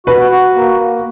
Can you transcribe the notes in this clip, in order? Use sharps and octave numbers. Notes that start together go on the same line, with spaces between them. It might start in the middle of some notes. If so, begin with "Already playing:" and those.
F#4 B4
F#4
A#3